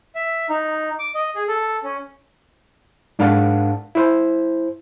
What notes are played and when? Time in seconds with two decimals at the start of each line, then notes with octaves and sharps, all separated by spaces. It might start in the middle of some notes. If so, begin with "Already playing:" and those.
0.15 E5
0.49 D#4
0.99 D6
1.15 D#5
1.35 G#4
1.48 A4
1.83 C#4
3.19 G#2 D4 A#4 F5 F#5 A5
3.95 E4 C5